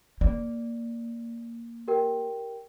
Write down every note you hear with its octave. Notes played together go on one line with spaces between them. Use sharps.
A#3 D5
G4 A#4 G5